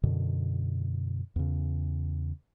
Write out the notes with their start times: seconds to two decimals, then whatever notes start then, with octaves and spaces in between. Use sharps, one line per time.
0.03 F#2 B2 D3
1.36 E2 C#3